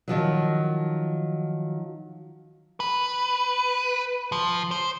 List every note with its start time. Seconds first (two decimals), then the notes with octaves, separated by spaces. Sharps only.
0.08 D#3 F3 F#3
2.80 B4
4.32 F3
4.71 C5